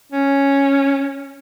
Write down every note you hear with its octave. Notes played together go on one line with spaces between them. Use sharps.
C#4